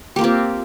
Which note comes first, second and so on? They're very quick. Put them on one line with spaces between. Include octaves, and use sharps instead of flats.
G4 A#3 F4 C4